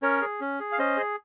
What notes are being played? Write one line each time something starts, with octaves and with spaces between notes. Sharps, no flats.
C#4 A#4 C#5
G#4
C#4
G#4
F5
C#4 C5 D#5
G#4